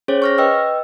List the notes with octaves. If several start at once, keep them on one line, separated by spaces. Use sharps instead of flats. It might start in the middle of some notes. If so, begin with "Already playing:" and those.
C#4 G#4 C5 C#5
C#6 F6 A#6
B4 D#5 G5 E6